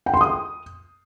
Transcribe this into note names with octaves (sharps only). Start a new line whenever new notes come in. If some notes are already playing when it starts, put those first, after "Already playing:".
G5
C6
D#6